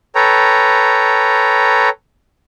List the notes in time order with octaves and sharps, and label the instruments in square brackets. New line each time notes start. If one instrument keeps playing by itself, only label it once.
[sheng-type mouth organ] A4 B4 C#5 G5 A#5